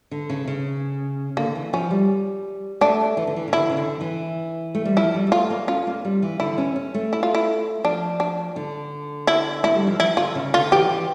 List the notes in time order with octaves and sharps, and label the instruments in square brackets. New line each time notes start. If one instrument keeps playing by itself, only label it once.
[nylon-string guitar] D3
C#3
C#3
[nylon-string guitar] D3 [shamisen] A#3
[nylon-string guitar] E3
[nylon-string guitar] F3 [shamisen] C#4
[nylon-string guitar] G3
[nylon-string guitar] A3 [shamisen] D4
[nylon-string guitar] E3
D3
E3
C#3
[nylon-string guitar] D3 [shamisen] E4
[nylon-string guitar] C#3
D3
E3
A3
G3
[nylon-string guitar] F3 [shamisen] E4
[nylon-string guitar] G3
G3
[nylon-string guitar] A3 [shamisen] F4
[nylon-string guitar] A#3
[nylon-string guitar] C#4 [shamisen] F4
[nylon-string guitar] A#3
G3
E3
[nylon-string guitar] D3 [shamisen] E4
[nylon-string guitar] C#4
C#4
A3
[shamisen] E4
F4
E4
[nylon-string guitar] F3 [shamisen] D4
[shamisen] D4
[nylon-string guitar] D3
[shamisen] E4
[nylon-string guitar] A3 [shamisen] E4
[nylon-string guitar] G3
F3
[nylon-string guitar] E3 [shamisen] E4
[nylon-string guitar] D3 [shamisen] F4
[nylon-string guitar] C#3
[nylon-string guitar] D3 [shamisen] F4
[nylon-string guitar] E3 [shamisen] G4
[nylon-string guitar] E3